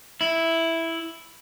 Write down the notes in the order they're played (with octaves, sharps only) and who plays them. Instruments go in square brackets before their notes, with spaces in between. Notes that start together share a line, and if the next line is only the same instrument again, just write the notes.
[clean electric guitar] E4